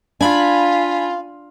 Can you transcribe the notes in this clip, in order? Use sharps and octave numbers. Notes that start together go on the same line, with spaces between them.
D4 F4 F5 G#5 B5